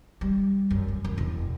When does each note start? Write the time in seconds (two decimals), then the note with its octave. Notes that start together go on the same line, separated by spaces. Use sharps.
0.21 G3
0.70 F#2
0.88 D2
1.04 F#2
1.18 E1